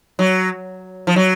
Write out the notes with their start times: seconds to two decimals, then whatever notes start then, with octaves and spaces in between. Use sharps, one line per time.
0.19 F#3
1.07 F3
1.16 F#3